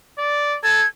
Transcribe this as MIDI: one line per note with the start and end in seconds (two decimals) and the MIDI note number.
0.18 0.56 74
0.64 0.82 69
0.64 0.87 92